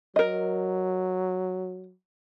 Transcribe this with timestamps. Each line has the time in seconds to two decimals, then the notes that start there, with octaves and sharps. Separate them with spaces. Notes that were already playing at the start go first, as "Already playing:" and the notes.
0.16 F#3 A#4 D#5